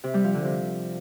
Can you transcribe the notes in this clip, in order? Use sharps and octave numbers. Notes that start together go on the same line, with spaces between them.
C3
G3
F3
D3
C3